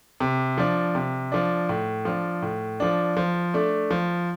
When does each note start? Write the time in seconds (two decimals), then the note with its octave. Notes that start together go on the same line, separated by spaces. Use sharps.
0.20 C3
0.58 F3 D4
0.95 C3
1.32 F3 D4
1.69 A2
2.05 F3 D4
2.42 A2
2.80 F3 D4
3.17 F3
3.54 A3 D4
3.91 F3